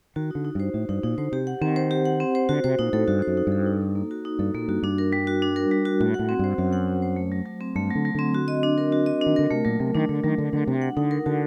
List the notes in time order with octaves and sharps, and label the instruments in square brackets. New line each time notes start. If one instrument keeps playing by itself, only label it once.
[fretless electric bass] D#3 [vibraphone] F#4
[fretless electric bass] D3 [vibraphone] D#4
[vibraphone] D#4
[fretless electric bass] G2 [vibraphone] C5
[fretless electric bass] A2 [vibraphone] F#4
[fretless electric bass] G2 [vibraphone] D#4
[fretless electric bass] A#2 [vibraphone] D#4
[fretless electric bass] D3 [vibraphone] C5
[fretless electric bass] C3 [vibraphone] G4
[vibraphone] F#5
[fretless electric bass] D#3 [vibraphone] C4
[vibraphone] C5
G4
F#5
C4
C5
[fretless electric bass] D3 [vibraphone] F#4
[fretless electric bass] C3 [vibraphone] C5
[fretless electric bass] A#2 [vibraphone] D#4
[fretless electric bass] A2 [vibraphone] A4
[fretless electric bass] G2 [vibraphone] F#4
[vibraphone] C5
[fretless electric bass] F#2
[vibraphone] D#4
[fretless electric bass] G2
[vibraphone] A4
D#4
A4
A#3
F#4
D#4
[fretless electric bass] G2 [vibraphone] A4
[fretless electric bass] A#2 [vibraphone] A#3
[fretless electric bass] G2 [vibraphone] F#4
[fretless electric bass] G2 [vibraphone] D4
[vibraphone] A#4
G3
F#4
D4
A#4
G3
F#4
[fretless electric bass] A2 [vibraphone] F#4
[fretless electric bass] A2 [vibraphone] F#5
[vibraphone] C4
[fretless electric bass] G2 [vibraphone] C5
[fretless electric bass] F#2 [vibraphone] F#4
[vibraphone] F#5
C4
C5
A3
F#3
F#3
C4
[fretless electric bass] G2 [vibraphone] A3
[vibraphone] F#3
[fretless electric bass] D3
[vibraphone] F#3
[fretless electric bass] D3 [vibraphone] C4
[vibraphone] F#4
D#5
D4
A#4
F#4
D#5
[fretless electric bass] D#3 [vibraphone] D4
[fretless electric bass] D3 [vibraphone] A#4
[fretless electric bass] C3 [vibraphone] A3
[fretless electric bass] A#2 [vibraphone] F#3
[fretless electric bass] C3 [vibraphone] F#3
[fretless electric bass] D#3 [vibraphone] D4
[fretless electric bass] D3 [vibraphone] A3
[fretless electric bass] D#3 [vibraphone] F#3
[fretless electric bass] D3 [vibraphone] F#3
[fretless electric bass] D3 [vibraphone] D4
[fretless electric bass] C3 [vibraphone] F#4
[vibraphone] F#5
[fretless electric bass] D3 [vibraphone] D#4
[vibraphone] A#4
[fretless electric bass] D3 [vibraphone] F#4